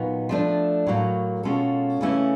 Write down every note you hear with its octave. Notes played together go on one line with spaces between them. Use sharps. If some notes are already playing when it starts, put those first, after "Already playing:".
Already playing: A#2 F#3 B3 D#4
F3 A3 D4
A2 F#3 A#3
B2 G#3 C#4 F4 A4
C#3 E3 A3 C#4 E4